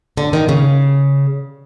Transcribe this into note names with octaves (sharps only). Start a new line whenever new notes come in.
D3
D#3
C#3